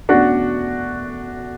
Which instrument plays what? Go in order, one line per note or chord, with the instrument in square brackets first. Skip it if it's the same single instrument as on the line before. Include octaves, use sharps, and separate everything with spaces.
[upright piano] E2 B2 A3 C#4 [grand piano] D4 F#4